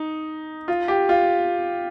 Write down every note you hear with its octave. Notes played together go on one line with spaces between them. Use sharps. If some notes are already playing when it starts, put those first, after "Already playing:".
Already playing: D#4
F4
G4
F4